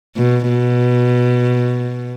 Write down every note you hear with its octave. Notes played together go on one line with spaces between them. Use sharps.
B2
B2